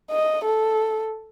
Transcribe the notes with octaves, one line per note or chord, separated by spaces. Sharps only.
D#5
A4